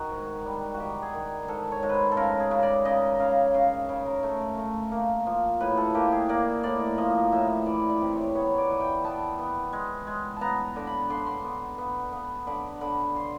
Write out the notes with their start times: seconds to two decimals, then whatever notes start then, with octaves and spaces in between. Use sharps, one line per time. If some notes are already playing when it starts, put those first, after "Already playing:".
Already playing: D#3 F#4
0.11 G#2
0.45 G3
0.74 F#4
0.80 D#3 G4
1.02 G#4
1.14 D#3
1.48 G#2 A4
1.72 C#5
1.83 G#2
1.89 B4 C5
2.12 A4
2.17 C#3 A#4
2.40 G#4
2.51 C#3
2.63 D5
2.85 C#3 D#5
3.20 C#3 F5
3.54 C#3 F5
3.89 C#3
4.06 A#4
4.23 A3
4.58 A3
4.92 A#3
5.27 F3
5.60 A2 B4
5.77 A4
5.94 A#3 G4
6.12 G#4
6.29 A#3 D5
6.63 A2 D5
6.98 F3 D#5
7.32 A2 E5
7.66 E3 D5
7.89 D5
8.01 C3
8.13 C#5
8.35 B3 C#5
8.54 C#5 D5
8.70 E3
8.81 G5
9.04 B3 A5
9.38 B3
9.73 G#3
10.07 G#3
10.36 A5
10.41 B3 A#5
10.76 D3
10.87 B5
11.10 D3 C6
11.17 B5
11.26 C6
11.44 B3
11.78 B3
12.12 B3
12.47 D3 B5
12.81 D3 B5
13.16 C6